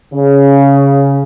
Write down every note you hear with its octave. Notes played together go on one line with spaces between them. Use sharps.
C#3